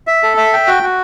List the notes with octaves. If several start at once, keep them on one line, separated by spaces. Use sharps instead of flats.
E5
A4
E5
G5
F#4
F#4